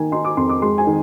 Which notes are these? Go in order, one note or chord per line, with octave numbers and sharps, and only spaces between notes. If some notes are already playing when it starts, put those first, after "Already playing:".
Already playing: D#3 A#3 G#5
D#4 C6
D6
F2 C6
D6
G#3 C6
G#5
D#3